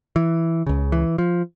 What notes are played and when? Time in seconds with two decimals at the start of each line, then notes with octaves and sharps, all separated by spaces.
0.16 E3
0.66 C#2 C#3
0.92 E3
1.18 F3